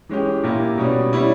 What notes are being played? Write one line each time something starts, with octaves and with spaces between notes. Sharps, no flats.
E3 G#3 C#4 G4
A#2 A#3 E4 G4
B2 G3 C#4
G3 C#4 E4